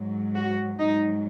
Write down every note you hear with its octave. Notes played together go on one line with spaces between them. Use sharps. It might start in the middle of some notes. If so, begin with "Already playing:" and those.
Already playing: G#2 F#3
F#4
G#2 F#3 D#4